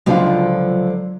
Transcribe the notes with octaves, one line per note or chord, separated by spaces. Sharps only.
C#2 D3 F3 F#3 D4 F5